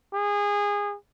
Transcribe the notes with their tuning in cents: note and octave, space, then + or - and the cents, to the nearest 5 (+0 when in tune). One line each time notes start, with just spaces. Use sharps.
G#4 -25